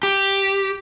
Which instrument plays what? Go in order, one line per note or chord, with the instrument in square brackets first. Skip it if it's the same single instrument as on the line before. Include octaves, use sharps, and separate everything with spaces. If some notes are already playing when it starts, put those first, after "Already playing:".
[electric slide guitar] G4